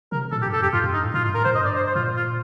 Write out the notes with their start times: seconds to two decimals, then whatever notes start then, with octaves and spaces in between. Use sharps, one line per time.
0.12 C3 A#4
0.32 A#2 A4
0.42 G4
0.46 G2
0.53 A4
0.60 F2 G4
0.73 G2 F4
0.84 F2
0.93 G2 D#4
1.04 A2
1.14 A#2 F4
1.21 A2
1.24 F4
1.29 G2
1.35 A2 A#4
1.45 A2 C5
1.55 G2 D#5
1.65 D5
1.76 C5
1.86 C5
1.95 A#2 F4
2.16 F4